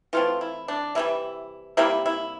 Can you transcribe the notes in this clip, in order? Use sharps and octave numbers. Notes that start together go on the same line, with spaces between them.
E3 A3 C4 F4
E4
D4
C3 E3 G3 E4
C3 G3 A#3 E4
E4